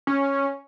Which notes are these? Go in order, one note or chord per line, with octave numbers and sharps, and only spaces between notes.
C#4